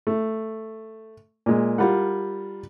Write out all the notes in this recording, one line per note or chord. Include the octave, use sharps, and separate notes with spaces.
A3
A#2 G#3
G3 F4 A#4 F#5